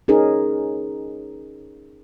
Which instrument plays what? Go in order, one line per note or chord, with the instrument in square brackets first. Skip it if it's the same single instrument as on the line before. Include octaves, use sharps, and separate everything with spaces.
[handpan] C#4 D#4 G#4 A#4